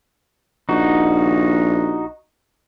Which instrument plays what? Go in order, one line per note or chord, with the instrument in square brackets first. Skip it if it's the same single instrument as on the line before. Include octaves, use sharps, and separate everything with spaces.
[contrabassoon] A#1 [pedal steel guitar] D#4 F#4